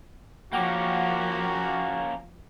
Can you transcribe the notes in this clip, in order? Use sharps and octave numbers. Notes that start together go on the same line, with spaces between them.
F3 A#3 C#4 F#4 F#5 G5 D6